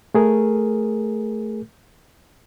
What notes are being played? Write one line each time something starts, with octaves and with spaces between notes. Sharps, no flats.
A3 G#4 A#4